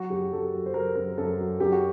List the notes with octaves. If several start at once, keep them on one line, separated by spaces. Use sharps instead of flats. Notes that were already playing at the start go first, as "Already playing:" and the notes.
Already playing: F#3 F#4
F#2 G4
F#2 A4
F#3
C5
F#3 A#4
F#2 A#4
F#2 A4
F#3
F#2 G4
F#4